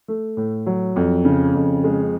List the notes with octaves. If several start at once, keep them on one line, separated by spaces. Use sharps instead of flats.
A3
A2
F#3
F2
C#3
F2
G#3